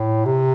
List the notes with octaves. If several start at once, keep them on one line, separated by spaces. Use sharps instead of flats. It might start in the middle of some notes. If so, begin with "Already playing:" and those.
Already playing: A2
C3